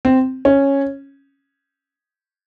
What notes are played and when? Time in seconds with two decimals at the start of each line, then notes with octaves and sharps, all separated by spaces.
0.05 C4
0.45 C#4